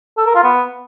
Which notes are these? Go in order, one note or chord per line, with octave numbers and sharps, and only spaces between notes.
A4
A#4
F4
B3